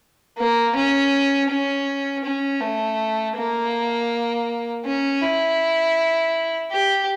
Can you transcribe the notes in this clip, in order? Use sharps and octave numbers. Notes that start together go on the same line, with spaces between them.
A#3
C#4
C#4
C#4
A3
A#3
C#4
E4
G4